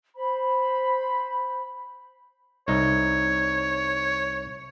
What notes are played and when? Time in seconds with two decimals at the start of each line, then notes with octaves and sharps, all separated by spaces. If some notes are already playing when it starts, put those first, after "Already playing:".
0.16 C5 B5
2.68 C2 D#4 C#5